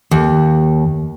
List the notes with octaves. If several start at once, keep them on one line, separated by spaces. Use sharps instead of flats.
D#2